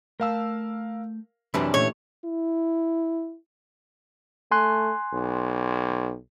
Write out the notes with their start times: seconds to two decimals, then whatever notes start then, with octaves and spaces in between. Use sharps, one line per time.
0.20 A3 A#4 F5 A5 E6
1.54 F#2 C3 E3 C#4 D4 E4 B5
1.74 A#2 A3 G4 C#5
2.25 E4
4.51 A3 G#5 C6 F#6
5.13 B1